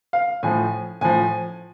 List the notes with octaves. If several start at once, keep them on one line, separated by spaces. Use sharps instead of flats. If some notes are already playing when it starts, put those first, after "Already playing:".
F5
A2 F3 G#5
A2 F3 G#5